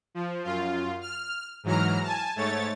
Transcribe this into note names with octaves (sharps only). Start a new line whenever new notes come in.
F3
F#2 F4
F6
G#2 E3 F#3 A#5 F6
G#5 A5
G#2 A3 C#5 A6